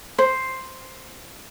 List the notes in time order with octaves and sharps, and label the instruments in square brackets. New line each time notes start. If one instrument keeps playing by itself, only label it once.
[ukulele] C5